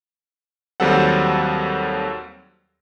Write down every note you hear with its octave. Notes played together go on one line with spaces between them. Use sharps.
D#2 F#3 G3 C4 A4 F#5